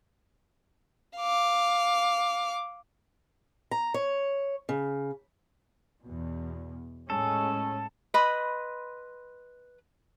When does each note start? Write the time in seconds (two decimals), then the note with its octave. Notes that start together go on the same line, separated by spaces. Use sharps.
1.17 F5 D6
3.71 A#5
3.94 C#5
4.69 C#3
6.03 E2 B2
7.10 A2 G#3 C#4 A4
8.14 B4 D#5 B5 C6